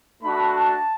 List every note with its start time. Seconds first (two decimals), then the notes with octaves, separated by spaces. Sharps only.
0.22 A3 D4 F#4 B5
0.54 A5